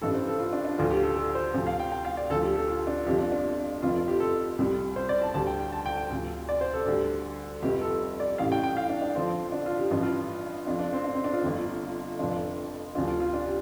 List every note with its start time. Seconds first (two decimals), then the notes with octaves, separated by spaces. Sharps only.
0.02 A1 G2 G3 A4
0.14 C5
0.27 A4
0.40 F4
0.53 D4
0.65 D4
0.78 D2 D3 F3 F4
0.90 G4
1.03 A4
1.16 A4
1.35 C5
1.54 D2 C3 F3
1.67 F5
1.80 G5
1.92 G5
2.05 F5
2.17 D5
2.30 D2 D3 F3 A4
2.43 G4
2.55 A4
2.68 F4
2.87 D4
3.06 G1 F2 F3 G4
3.19 D4
3.32 D4
3.82 F1 F2 F3 F4
3.95 F4
4.08 G4
4.20 A4
4.59 C2 C3 G3
4.96 C5
5.09 D5
5.22 A5
5.34 D2 D3 G3 A5
5.47 G5
5.60 G5
5.72 A5
5.86 G5
5.97 G5
6.10 D2 C3 F3
6.49 D5
6.61 C5
6.73 A4
6.86 D2 D3 G3
7.62 F1 F2 C3 G3 G4
7.81 A4
8.20 D5
8.38 A1 A2 G3 F5
8.52 G5
8.63 G5
8.77 F5
8.89 D4
9.02 D4
9.15 F2 D3 F3 C4
9.52 D4
9.66 F4
9.78 G4
9.91 A1 G2 F3
10.03 F4
10.67 F2 F3 D4
10.79 D4
10.93 C4
11.05 D4
11.15 C4
11.24 D4
11.33 F4
11.43 G1 F2 D3
12.19 F1 F2 F3 D4
12.95 D2 C3 F3 D4
13.08 F4
13.20 F4
13.34 D4
13.46 G4